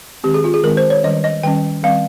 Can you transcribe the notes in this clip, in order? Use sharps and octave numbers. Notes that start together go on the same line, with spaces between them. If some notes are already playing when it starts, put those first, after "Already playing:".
D#3 G#3 C4 G4
G#4
F4
G#4
D#3 G#3 C4 A#4
C5
C#5
D#3 G3 C#4 D#5
D#5
D#3 G3 C#4 G5
D#3 G3 C4 F5